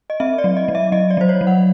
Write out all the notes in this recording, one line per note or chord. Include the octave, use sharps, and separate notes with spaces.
D#5
C4 E5
D5
F#3
D#5
F#3
E5
F#3 D#5
D5
F#3 C5
C#5
F#3
F#5